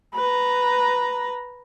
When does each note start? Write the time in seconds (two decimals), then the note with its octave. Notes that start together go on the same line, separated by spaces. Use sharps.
0.15 B4 A#5